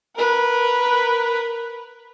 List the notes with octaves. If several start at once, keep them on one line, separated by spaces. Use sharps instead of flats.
A#4 B4